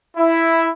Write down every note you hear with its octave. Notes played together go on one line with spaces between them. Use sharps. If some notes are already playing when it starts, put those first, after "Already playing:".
E4